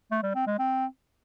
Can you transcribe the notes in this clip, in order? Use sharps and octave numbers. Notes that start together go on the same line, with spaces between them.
A3
G3
C4
G#3
C4